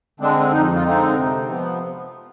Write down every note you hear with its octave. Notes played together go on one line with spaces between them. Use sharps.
D3 G#3 C4 D4
F2 D#4
F4
D3 G#3 C4 D#4
C3
F3 B3